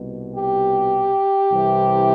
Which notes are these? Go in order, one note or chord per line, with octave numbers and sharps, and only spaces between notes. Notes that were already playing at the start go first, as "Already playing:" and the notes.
Already playing: C2 B2
G4
C2 C3 E3